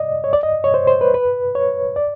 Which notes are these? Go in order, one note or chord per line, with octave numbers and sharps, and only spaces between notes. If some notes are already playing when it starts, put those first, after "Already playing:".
Already playing: D5 D#5
C#5
D5
D#5
C#5
C5
C5
B4
B4
C#5
D5